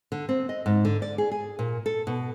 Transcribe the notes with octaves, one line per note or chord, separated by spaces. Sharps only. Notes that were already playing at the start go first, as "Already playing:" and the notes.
D3
C4
D#5
G#2
D3
D5
G#4
G#4
A#2
A4
B2